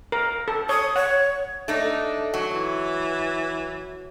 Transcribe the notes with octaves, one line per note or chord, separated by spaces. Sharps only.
A#4
A4
C#5 D#6
C#5 F#5
A3 D4 D#4
F#3
E3